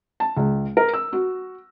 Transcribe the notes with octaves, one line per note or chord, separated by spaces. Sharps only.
A5
C#2
A#4
E6
F#4